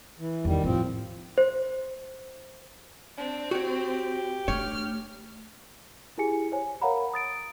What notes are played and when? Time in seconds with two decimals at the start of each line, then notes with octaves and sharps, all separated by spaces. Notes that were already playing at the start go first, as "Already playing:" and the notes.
0.19 E3
0.45 E2 D#3 G3
0.64 A2 F3 C4 F4
1.38 C5
3.18 C4 D4
3.51 F#4 G4 C#5
4.48 A3 D4 C#5 F6
6.18 E4 G4 G#4 G#5 C#7
6.52 C5 C#5 G#5
6.82 A#4 C#5 F5 F#5 A#5 B5
7.14 D#6 A6 D7